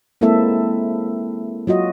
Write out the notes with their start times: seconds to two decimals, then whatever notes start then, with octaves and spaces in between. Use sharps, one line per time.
0.21 G#3 A#3 C4 E4 A4 E5
1.67 F#3 F4 F#4 D#5